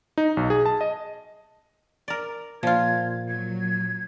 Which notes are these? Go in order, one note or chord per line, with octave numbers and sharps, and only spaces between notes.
D#4
B1
G#4
A5
D#5
A#4 D5
A#2 F3 F4 G#6
F#3 G#6